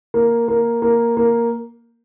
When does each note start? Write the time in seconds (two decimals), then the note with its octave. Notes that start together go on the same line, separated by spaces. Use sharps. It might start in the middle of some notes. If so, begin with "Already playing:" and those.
0.14 A#3
0.48 A#3
0.82 A#3
1.17 A#3